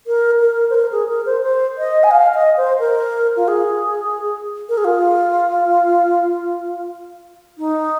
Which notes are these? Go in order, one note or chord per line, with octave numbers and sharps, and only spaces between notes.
A#4
A#4
C5
A#4
G#4
A#4
C5
C5
D#5
G#5
F5
D#5
C5
A#4
F4
G#4
A#4
G#4
F4
D#4